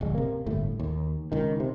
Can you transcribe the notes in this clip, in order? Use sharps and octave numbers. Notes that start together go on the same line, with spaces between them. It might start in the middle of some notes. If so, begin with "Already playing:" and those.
D1 A#1 G#3
C3 A#3
G1 A2 A3
D#2
C#2 D#3
C3